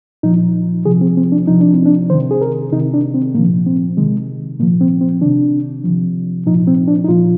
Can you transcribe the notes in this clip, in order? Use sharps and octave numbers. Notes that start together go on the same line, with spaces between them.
A#2 F3 D#4
C3 F3 G#4
C4
C4
D4
C3 F3 D#4
D4
C4
D4
C3 D#3 C5
G#4
A#4
C3 D#3 D#4
D4
C4
A#2 F3 A#3
C4
C3 D#3 G#3
A#2 F3 A#3
C4
C4
C3 D#3 D4
C3 F3
A#2 F3 D#4
C4
D4
D#4
A#2 F3 F4